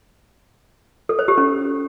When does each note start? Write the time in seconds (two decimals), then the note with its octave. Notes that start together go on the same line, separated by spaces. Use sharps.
1.09 A4
1.19 C5
1.28 G4
1.38 C#4